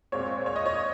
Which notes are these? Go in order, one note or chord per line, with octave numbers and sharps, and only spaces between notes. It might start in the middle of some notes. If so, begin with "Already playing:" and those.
A#2 G#3 C4 C#5
C#5
D#5
C#5